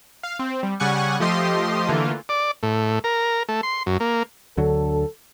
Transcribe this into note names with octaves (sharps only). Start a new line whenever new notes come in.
F5
C4
G3
C#3 G3 F#5 G#5 C#6
F3 A3 G4 D#5 C6
D3 E3 A3 A#3 F4
D5
A2
A#4
A3
C6
F#2
A#3
D2 D3 F#3 A4